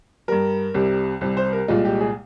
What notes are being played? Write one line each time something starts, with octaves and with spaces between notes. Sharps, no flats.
G2 G3 A#4
C2 C3 G3
C2 C3 G3
C5
A#4
C2 A#2 G#3 F4
G4
G#4